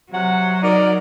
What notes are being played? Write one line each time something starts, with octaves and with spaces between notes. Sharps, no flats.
C3 F#3 C#5 F#5
D#4 A#4 D5